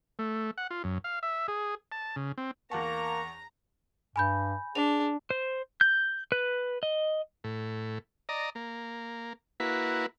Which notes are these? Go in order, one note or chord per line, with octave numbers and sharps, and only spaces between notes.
A3
F#5
F4
F#2
F5
E5
G#4
A5
C#3
C4
E2 A#3 F#5 A5 A#5 C#6
G2 G#5 B5 G6
D4 G#4 F7
C5
G6
B4
D#5
A2
D5 D#5 A#5
A#3
A#3 E4 F#4 B4